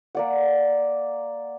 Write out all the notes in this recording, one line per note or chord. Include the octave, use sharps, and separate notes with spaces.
A#3 D5 F#5